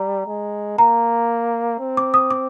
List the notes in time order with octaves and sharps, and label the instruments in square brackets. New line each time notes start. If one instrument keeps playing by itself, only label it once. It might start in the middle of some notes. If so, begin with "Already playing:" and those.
Already playing: [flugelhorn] G3 [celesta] A#5
[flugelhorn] G#3
[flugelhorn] A#3 [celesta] A#5
[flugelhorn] C4
[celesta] D6
D#6
D6